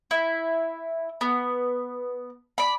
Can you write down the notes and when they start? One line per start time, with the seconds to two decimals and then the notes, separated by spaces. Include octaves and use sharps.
0.11 E4
1.21 B3
2.58 D5 B5